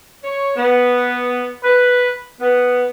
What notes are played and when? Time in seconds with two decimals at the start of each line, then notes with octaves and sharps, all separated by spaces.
0.24 C#5
0.57 B3
1.64 B4
2.40 B3